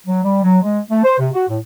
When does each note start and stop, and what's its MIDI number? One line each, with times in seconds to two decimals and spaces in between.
0.07 0.21 54
0.23 0.40 55
0.43 0.58 54
0.62 0.79 56
0.90 1.03 57
1.04 1.16 72
1.19 1.29 48
1.34 1.44 66
1.48 1.57 45